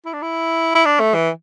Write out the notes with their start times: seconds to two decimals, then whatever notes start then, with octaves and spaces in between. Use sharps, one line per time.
0.05 E4
0.13 D4
0.22 E4
0.75 E4
0.85 D4
1.00 A3
1.14 E3